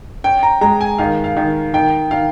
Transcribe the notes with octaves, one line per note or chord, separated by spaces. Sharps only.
C#4 G5
A#5
G#3 A#5
G#5
D#3 F5
F5
D#3
D#3 G5
D#3 F5